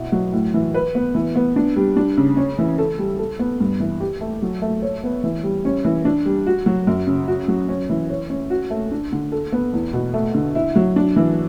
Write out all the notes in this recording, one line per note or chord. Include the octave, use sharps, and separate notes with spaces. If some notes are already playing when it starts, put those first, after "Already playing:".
Already playing: B2 E4
F#3
A2
E3
B4
B3
E3
B3
D4
G3
D4
C#3
C#4
E3
A4
G3
A4
B3
G2
E3
G4
A3
F#3
A3
C#5
B3
E3
G3
C#4
E3
D4
G3
F#4
F#3
F#2
C#3
F#4
F#3
C#4
E3
C#5
C#4
F#4
A3
D4
D3
A4
B3
E2
B2
A3
D3
E4
F#3
D4
E3